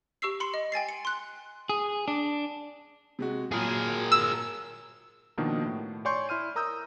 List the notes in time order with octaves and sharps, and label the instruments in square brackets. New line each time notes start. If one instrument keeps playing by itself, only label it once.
[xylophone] G4 C#6 E6 C7
B5 C6 C#7
D#5
G5 G#5 A6 C7
C#7
C6 F#6
[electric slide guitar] G#4
D4
[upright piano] C3 G#3 F#4
[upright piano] A#2 F#3 [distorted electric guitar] G#4 A#4
[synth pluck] E6
[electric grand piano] B2 D#3 F3 A#3 D4 D#4
A2
C#5 D5 G#5 C6 C#6 G6
E4 C6 F6 D#7
A#4 A#5 D#6 E6 G6